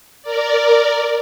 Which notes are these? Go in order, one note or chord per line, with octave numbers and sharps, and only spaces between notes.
A#4 D5